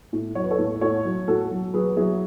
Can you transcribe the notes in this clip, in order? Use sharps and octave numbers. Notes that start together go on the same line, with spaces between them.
A2
F#3 C#5
B4
A4 C#5
A2
A2 A4 C#5
F#3
A2 F#4 A4
F#3
F#3 G#4 B4
F#3 E4 G#4